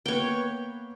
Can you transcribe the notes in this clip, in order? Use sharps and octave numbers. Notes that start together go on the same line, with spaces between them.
A#3 B3 B4 C#5 G5